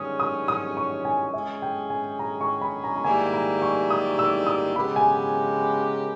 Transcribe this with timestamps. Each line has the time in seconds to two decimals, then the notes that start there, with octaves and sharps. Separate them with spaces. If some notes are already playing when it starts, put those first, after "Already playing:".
Already playing: G#2 D#3 G3 C#4 D#6
0.20 D#6
0.48 D#6
0.77 C#6
1.05 G#5
1.34 G#3 C#4 G#4 E5
1.62 G5
1.90 G#5
2.19 A#5
2.41 C#6
2.61 B5
2.84 A#5
2.96 A#5
3.04 G#2 D#3 G3 A#3 E4 G#5
3.34 A#5
3.62 C#6
3.90 D#6
4.19 E6
4.47 D#6
4.76 C#3 G#3 B3 G4 A#4 B5
4.96 G#5